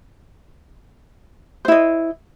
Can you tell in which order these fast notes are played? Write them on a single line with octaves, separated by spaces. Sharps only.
C5 E4 D#5